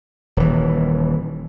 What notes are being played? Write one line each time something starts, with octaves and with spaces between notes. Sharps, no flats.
D#1 E3